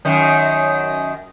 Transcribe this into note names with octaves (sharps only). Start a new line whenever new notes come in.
F#2 D#3